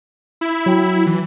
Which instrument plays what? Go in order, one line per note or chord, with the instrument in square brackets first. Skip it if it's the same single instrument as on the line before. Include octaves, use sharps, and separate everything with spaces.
[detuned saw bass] E4
[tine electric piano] F#3 G5 B5
[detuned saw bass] E3